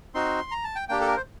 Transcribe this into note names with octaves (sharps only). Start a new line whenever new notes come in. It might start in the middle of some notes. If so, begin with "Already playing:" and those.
C4 D#4 F#4 C6
A#5
A5
G5
A#3 D4 G4 G5
A4
A#4
C5